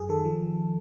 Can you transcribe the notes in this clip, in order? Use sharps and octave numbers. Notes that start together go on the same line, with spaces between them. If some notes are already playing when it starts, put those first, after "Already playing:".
Already playing: F#2 G#4
D#3 A4
F3